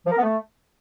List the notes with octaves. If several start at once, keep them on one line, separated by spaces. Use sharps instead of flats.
F3
A#4
B3
A3